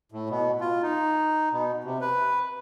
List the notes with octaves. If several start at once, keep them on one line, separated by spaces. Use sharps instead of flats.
A2
B2
F4
D#4
B2
C3
B4